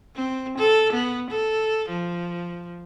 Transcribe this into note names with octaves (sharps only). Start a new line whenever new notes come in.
C4
A4
B3
A4
F3